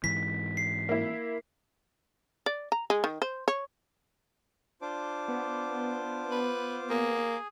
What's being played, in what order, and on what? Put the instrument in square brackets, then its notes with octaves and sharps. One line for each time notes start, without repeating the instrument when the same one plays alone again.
[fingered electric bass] G#2 E3 [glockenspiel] B6
[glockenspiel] C7
[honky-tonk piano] A#3 E4
[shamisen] D5
A#5
G#3
D#3
C5
C#5
[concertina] D4 [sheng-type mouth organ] F4 C5 D6
[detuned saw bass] B3
[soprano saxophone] B4
[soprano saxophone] A#3 [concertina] G#4